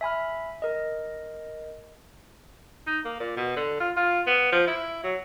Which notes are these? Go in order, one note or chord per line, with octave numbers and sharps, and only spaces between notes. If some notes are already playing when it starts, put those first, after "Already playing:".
E5 G#5 B5 F6
A#4 D#5
D#4
A#3
A#2
B2
D3
F4
F4
B3
F3
E4
F#3